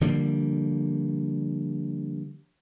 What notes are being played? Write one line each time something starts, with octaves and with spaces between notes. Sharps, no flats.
D3 F3 G3 A#3